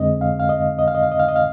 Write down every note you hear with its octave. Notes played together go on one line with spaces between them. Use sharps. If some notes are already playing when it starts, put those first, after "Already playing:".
Already playing: F2 D3 G#3 C4 D#5
F5
F5
D#5
D#5
F5
D#5
F5
D#5
F5
D#5
F5